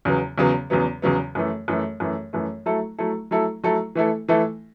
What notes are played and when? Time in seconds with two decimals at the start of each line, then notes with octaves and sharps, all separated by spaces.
0.05 E2 C#3 F#3 B3
0.38 E2 C#3 F#3 B3
0.70 E2 C#3 F#3 B3
1.02 E2 C#3 F#3 B3
1.35 F#2 E3 A3
1.68 F#2 E3 A3
2.00 F#2 E3 A3
2.33 F#2 E3 A3
2.66 F#3 A3 E4 A4
2.99 F#3 A3 E4 A4
3.31 F#3 A3 E4 A4
3.64 F#3 A3 E4 A4
3.95 E3 A3 E4 A4
4.29 E3 A3 E4 A4